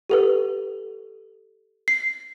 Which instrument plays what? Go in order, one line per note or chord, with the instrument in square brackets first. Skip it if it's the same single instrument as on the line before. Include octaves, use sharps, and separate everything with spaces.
[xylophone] G4 A4 B4
C7